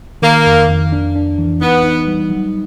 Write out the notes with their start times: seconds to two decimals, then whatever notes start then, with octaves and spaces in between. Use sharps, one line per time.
0.22 D#3 A#3
0.46 F2
0.68 F2
0.92 D4
1.16 D4
1.39 E3
1.61 B3 D#4
1.84 D#4
2.07 G3
2.31 F#3